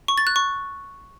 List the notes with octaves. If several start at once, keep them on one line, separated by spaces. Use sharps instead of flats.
C#6
A6
F#6
C#6